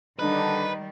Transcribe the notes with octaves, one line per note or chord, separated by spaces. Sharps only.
D3 D#3 G3 D4 D#4 B4